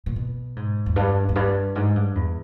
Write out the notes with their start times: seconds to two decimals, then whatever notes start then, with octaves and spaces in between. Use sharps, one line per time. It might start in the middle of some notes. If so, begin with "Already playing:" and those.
0.06 A#2
0.16 B2
0.56 G#2
0.86 E2
0.96 G2
1.29 E2
1.36 G2
1.75 G#2
1.96 G2
2.15 E2